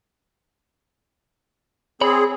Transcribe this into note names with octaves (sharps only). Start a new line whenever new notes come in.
C4 G#4 C#5 B5